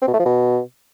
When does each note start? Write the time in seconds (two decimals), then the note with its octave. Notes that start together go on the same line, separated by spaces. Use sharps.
0.02 C4
0.08 B2
0.14 A3
0.20 F3
0.26 B2